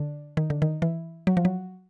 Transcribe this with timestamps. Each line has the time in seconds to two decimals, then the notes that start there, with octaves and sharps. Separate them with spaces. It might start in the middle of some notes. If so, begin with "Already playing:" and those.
Already playing: D3
0.37 D#3
0.50 D3
0.62 D#3
0.82 E3
1.27 F#3
1.37 F3
1.45 F#3